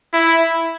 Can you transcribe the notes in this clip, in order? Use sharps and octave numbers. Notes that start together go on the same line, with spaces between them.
E4